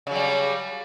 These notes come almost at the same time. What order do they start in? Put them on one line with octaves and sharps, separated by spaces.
C#3 F#3 G3